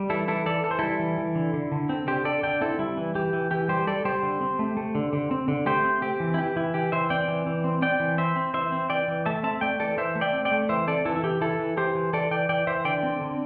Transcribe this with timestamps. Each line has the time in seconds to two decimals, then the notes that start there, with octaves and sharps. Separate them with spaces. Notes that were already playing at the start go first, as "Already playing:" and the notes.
Already playing: G3
0.10 E3 E4 A4
0.28 E3 E4 A4
0.46 E3 A4 D5
0.64 E3 A4
0.71 C5
0.79 G3 E4 A4
0.99 E3
1.18 E3
1.35 D3
1.54 D3
1.72 D3
1.89 C4
2.07 D3 G4 C5
2.25 D3 A4 D5
2.43 D3 D5 G5
2.61 C4 E4 A4
2.79 G3 E4
2.97 E3
3.15 E3 G4
3.33 E3
3.51 E3 G4
3.68 G3 G4 C5
3.87 G3 A4 D5
4.05 G3 G4 C5
4.23 D3
4.41 C4
4.59 A3
4.77 A3
4.95 D3
5.13 D3
5.31 C4
5.48 D3
5.66 A3 G4 C5
5.84 C4
6.02 C4 G4
6.20 E3
6.34 E4
6.38 E3 G4
6.56 E3 E4
6.74 E3 G4
6.92 E3 C5 E5
7.10 C4 D5 G5
7.28 E3
7.46 E3
7.64 C4
7.82 C4 D5 G5
8.00 E3
8.18 C4 C5 E5
8.36 C4
8.54 E3 C5 E5
8.72 C4
8.90 E3 D5 G5
9.08 E3
9.26 A3 E5 A5
9.43 C4 E5 A5
9.61 A3 D5 G5
9.80 E3 A4 D5
9.97 E3 C5 E5
10.15 A3
10.21 D5 G5
10.33 C4
10.45 D5 G5
10.51 A3
10.69 E3 C5 E5
10.87 C4 A4 D5
11.05 E3 E4 A4
11.16 E4
11.23 E3 G4
11.41 E3 E4 A4
11.59 E3
11.77 E3 G4 C5
11.95 E3
12.13 E3 A4 D5
12.31 E3 D5 G5
12.49 E3 D5 G5
12.67 E3 C5 E5
12.85 D3 D5 G5
13.03 C4
13.21 D3